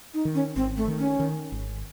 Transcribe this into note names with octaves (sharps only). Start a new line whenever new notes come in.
D#4
D#3
C#4
G#1 C4
A3
D#3
C#4
D#3
G#1